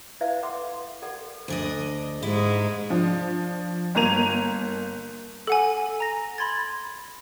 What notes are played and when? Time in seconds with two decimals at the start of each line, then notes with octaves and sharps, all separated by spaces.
0.21 E4 B4 C5 D5 E5 F5
0.43 A4 B4 F#5 C6 D6
1.02 G4 A4 A#4 D5 F#5
1.48 D2 D4 D#5
2.22 G#2 G#3 E4
2.90 F3 D4
3.95 G1 A#3 A#5 G#6 D#7 F7
5.47 A4 F#5 G#5
6.00 A#5 A#6
6.38 B5 C6 G#6 A6